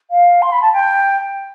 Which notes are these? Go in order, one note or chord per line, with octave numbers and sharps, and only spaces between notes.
F5
C6
B5
A5
G5